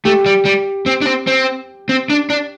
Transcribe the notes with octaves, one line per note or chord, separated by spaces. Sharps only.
A3 G4
G3
G3
C4
D4
C4
C4
C4
D4
D4